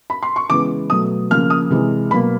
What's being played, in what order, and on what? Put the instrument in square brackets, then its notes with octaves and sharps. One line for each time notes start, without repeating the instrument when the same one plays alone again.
[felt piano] B5
C6
C#6
C#3 E3 G#3 B3 D6
B2 F#3 A3 D#6
C#3 F3 A#3 F6
D#6
C3 E3 G#3
B2 F#3 A#3 B5